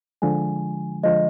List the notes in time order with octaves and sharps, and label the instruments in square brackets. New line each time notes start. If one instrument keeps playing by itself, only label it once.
[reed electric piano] D3 F3 G#3 [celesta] G#5
[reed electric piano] D3 F3 G#3 [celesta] D#5